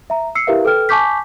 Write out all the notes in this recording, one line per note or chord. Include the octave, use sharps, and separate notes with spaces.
E5 A#5
E6 C7 C#7
E4 G4 A#4 B4 E5 F5
A4 B4 G5 F6
G#5 A5 C#6 D6 G6 B6